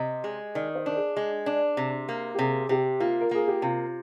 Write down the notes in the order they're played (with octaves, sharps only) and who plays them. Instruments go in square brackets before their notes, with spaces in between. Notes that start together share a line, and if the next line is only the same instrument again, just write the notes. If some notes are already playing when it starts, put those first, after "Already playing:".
Already playing: [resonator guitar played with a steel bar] C3 [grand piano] D#5
[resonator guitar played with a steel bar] G#3
[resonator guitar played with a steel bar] D#3 [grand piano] D5
[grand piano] C5
[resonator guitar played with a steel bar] D4 [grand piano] A#4
[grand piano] G#4
[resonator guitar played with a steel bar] G#3
D4
C3
A#3
[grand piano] G4
[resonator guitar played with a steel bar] C3 [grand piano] G#4
[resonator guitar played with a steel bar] C3 [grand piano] G4
[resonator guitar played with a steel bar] A#3 [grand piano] F4
[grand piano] A#4
[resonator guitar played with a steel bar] A#3 [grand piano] G#4
[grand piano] G4
[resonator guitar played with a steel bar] C3 [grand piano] F4